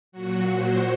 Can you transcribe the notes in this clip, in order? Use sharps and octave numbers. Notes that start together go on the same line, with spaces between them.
A#2 F#3 F#4
C5